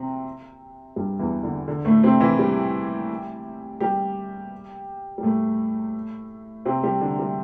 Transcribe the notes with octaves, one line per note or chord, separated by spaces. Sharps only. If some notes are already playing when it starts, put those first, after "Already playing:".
Already playing: C3 C4
G2 G3
E2 E3
D3
D3
A2 A3
C3 C4
E3 E4
G3 G4
G3 G4
G3
A2 A3
C3 C4
G3 G4
D3 D4
G3